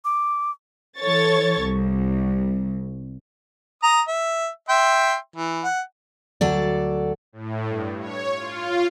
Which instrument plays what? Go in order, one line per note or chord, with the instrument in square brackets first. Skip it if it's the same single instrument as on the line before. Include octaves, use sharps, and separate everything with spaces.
[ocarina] D6
[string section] E3 A4 C#5 C#6 A6
C2
[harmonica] A#5 D#6
E5
E5 G5 C6
E3
F#5
[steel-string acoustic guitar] D2 F#3 A4 D5
[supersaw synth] A2
G2
C#5
F4